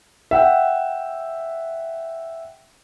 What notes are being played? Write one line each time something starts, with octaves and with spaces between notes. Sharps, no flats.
E5 F#5 G5